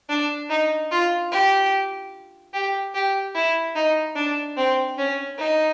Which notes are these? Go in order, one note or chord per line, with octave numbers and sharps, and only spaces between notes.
D4
D#4
F4
G4
G4
G4
E4
D#4
D4
C4
C#4
D#4